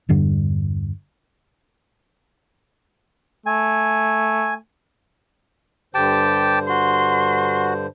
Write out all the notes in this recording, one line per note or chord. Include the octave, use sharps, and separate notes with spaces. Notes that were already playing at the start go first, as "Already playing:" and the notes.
E2 G2 D3 G3
A3 G#5
G2 D3 G4 C5 G5 A5
F#4 C6